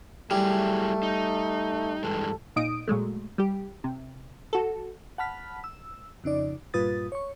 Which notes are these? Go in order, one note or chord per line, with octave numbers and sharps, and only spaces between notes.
F#3 G3 A3 E4 G#4
D#4
G2 E3 G#3 A4
A#2 D#4 D#6 D7
A#2 F#3 G#3 A3
G3 G4
C3
F#4 A4
F#5 A5 B5 F6 B6
E6
F2 C#3 D#4 D5
G2 A#2 F4 B4 D#6 A6
C#5 C#6